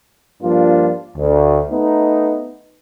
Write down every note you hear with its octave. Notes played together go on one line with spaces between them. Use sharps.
G2 F3 A#3 D4 F4
D2
A3 B3 D#4